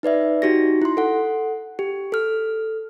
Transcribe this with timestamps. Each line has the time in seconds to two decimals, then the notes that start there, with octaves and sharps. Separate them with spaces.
0.03 D#4 B4 D5 E5
0.42 D#4 F#4 G4 A#6
0.82 E4 C6
0.97 A4 F#5
1.79 G4
2.12 A4 F6